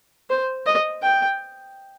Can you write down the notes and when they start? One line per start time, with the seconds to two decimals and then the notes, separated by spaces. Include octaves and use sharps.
0.30 C5
0.66 D#5
1.03 G5